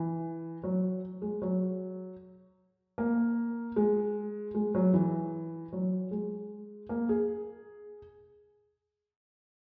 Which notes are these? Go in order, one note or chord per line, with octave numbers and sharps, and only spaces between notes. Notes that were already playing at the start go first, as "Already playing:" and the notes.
Already playing: E3
F#3
G#3
F#3
A#3
G#3
G#3
F#3
E3
F#3
G#3
A#3
G#4